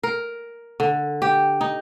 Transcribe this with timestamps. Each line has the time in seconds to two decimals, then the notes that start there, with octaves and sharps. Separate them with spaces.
0.03 A#4
0.80 D3
1.22 G4
1.61 D#4